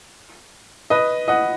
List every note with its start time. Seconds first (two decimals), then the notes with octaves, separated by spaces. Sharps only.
0.90 B4 D#5
1.28 D#5 F#5